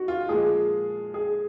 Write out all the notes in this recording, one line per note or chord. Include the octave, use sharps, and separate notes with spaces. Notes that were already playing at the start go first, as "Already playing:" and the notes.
Already playing: F#4
F4
A#2 F3 G#3 G#4
G#4